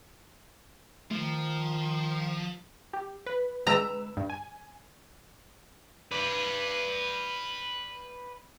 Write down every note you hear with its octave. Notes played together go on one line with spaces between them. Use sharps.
D#3 F3 A3
G4
B4
G#3 B4 A#5 E6
G2
G#5
B4 D5